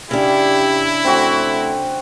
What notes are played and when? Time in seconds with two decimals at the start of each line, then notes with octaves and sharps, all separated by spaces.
0.11 C#3 D4 E4 G4
1.05 A3 C4 F#4